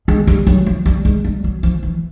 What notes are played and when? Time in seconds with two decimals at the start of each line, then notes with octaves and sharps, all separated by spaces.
0.08 G#3
0.27 G3
0.47 F#3
0.66 F3
0.86 G3
1.05 G#3
1.25 G3
1.44 F#3
1.63 F3
1.83 E3